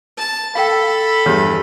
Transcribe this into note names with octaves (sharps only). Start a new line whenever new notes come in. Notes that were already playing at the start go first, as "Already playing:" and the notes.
A5
A4 F5 G5 B5
E2 G2 G4 C#5